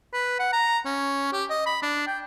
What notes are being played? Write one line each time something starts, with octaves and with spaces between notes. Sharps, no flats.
B4
F#5
A#5
C#4
G4
D#5
B5
D4
G5